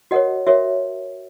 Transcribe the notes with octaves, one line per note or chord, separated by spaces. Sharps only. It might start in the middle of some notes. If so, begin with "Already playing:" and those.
F#4 A#4 C#5 D#5 F#5
F#4 A#4 C#5 E5